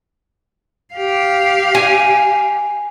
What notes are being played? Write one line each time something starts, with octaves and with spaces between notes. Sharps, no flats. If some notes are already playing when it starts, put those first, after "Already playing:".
G4 F5
G#5